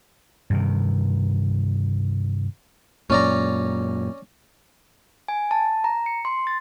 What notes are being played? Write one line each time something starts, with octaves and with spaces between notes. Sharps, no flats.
G2 C3 D#3
F#2 A#2 C#4 D5 A#5
G#5
A5
A#5
C#7
C6
A6